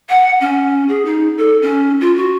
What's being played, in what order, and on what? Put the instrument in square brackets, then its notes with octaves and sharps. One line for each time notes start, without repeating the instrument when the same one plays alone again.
[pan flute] F#5
C#4
G#4
D#4
A4
C#4
F4
F#4